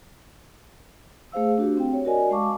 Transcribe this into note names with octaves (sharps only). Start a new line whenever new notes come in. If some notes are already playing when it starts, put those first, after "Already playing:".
A3 G#4 C5 F5 E6
D4 F#4 G4
C4 G5
C#5
F#4 A#4 D5 D#5 G#5
G#3 F5 A5 C#6 D6